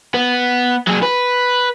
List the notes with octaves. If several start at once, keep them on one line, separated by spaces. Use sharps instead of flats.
B3
F#3 G#4
B4